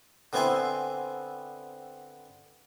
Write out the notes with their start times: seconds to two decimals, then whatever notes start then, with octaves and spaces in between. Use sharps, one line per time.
0.33 D3 B3 C4 E4 G#5 C6